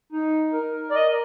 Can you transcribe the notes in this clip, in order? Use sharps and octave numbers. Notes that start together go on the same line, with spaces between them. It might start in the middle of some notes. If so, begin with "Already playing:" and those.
D#4
A#4
D5
A#4 D#5